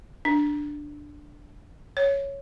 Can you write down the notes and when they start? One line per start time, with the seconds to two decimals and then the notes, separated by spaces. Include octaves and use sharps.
0.25 D4
1.97 C#5